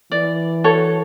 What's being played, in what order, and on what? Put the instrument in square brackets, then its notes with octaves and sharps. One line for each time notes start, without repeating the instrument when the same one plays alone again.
[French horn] E3 [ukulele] D5
[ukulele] F#4 A4 C#5